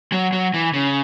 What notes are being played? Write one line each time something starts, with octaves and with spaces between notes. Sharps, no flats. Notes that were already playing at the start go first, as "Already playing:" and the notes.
F#3
F#3
E3
C#3